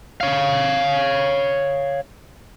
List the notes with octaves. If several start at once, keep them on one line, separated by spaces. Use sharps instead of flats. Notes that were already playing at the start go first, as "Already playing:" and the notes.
C#5 F5